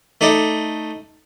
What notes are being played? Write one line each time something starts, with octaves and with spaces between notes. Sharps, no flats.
A3 D#4 D5